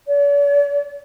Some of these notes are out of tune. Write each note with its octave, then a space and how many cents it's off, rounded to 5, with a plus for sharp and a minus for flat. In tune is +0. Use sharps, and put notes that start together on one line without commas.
D5 -45